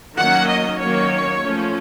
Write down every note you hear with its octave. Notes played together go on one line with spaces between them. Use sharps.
D#3 F#3 A#3 C#4 F#5
D#5
D#3 F#3 A#3 C#4 C#5
F3 A3 C#4